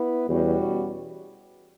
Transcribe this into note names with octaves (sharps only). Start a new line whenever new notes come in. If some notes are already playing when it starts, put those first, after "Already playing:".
Already playing: B3 E4 B4
E2 B2 G3 C#4 F#4